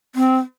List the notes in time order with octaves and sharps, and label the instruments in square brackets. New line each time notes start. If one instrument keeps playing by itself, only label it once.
[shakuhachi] C4